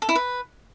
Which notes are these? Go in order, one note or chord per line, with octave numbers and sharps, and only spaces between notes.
A4
E4
B4